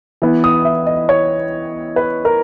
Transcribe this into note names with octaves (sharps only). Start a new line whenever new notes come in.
E3 B3
D#6
E5
D#5
C#5
B4
A#4